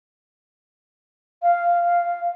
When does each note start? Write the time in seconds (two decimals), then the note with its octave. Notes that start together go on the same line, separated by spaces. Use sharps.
1.43 F5